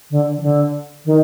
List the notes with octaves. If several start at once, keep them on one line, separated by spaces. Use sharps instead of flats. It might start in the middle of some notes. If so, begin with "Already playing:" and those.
D3
D#3
D3
D#3